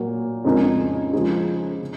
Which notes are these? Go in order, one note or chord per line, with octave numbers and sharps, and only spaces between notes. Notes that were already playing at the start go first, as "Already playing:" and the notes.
Already playing: A#2 F#3 A#3
F2 C#3 G#3 D#4 A#4
C#3 F3 G#3 D#4 G#4
C#3